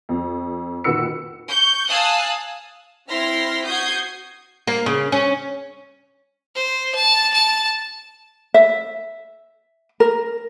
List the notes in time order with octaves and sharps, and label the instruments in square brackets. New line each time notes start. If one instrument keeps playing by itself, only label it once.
[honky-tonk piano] F2
A#2 D#3 F#4 B4 E6 C#7
[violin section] C#6 G6
F5 G#5 A5 D#6 E6 F#6
C4 E4 C6 F6 A#6 B6
F#4 D#6 G6 G#6 C7
[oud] A#3
C#3
C#4
[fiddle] C5
A5
A5
[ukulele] E5
A#4